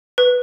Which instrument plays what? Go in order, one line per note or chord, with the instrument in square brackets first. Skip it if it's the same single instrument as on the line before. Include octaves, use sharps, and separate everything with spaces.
[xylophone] B4